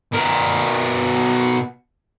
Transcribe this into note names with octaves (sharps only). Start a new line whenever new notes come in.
B2 A#4